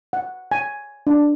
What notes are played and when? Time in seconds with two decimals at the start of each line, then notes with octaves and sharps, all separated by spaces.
0.13 F#5
0.52 G#5
1.07 D4